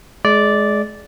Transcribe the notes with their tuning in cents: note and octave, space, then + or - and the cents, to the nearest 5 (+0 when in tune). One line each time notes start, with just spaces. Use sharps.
G#3 +25 D5 -10